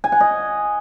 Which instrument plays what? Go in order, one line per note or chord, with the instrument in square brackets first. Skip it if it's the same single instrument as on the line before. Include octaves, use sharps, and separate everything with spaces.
[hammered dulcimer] G#5
F#5
D#5